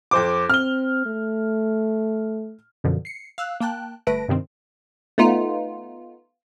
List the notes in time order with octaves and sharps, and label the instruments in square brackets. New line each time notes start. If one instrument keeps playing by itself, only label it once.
[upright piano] F2 C5 D6
[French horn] C4 [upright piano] F6 G7
[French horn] A3
[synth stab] F#2 B2 D3 F3
C7 C#7
F5 E6 F#6
A#3 G5 A5 F#6
G1 A3 B4 A5 A#6 D7
G2 C3 D#3 C4
A3 B3 D#4 F4